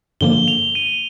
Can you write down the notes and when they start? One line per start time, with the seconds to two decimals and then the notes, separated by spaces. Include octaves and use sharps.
0.21 G2 D3 F3 A#3 G7
0.48 F7
0.75 D#7